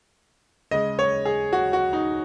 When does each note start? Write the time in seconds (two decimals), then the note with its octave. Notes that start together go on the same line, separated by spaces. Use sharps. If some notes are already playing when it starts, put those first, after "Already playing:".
0.71 C#3 G#3 D#5
0.99 C#5
1.25 G#4
1.53 F#4
1.73 F#4
1.93 D#4